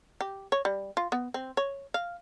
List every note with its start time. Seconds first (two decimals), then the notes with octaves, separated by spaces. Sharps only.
0.21 G4
0.52 C#5
0.65 G3
0.97 F4
1.12 B3
1.34 C4
1.57 C#5
1.94 F5